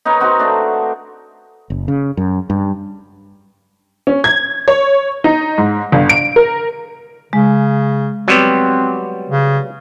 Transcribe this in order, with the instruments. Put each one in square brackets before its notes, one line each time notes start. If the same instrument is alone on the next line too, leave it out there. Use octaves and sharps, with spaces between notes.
[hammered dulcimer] D#4 A#4 B4 C#5
C4 D#4 F#4
A3 D4
[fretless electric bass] F#1
C#3
F#2
G2
[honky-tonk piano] C#4
G#6
C#5
D#4
G#2
G1
D7
A#4
[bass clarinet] C#3 [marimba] G#3
[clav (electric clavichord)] F#3 G3 B3 [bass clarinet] C4
[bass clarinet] C#3